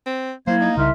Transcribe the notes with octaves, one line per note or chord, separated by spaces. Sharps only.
C4
F#3 A#3 E4 C5 G#6
D#4
C2 C#3 E5 C6 F6